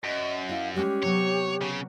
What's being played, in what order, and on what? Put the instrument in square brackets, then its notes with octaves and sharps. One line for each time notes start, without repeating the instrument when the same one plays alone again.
[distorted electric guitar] F#2 [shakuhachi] D#5
[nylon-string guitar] E4 D#5 [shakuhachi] F5
[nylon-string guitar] G3 G#3 C#4 [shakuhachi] G4
[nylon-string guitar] C3 F#3 B3 [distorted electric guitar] C#5
[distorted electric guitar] C#3